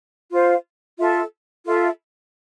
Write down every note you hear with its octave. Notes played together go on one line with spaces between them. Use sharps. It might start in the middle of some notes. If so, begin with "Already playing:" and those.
F4 C5 F5
F4 A4 E5
F4 A4 E5